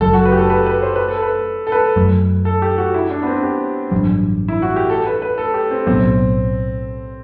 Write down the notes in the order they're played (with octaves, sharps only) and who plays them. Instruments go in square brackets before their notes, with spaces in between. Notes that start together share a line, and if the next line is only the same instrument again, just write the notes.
[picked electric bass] F#1 F#2 F#3 [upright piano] A4
[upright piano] F#4
B4
G4
A4
B4
B4
C5
B4
A4
B4
A4
B4
[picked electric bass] F#2 F#3 A3
[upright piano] A4
G4
F#4
E4
D4
B3
C4
G4
[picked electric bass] A1 G2 F#3
[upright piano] E4
F#4
G4
A4
B4
B4
A4
G4
C4
[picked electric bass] B1 A2 F#3 B3 [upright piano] C4